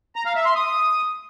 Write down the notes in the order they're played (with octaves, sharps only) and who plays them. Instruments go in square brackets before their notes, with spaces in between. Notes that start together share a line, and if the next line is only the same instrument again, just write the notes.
[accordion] A#5
F5
E5
C6
D#6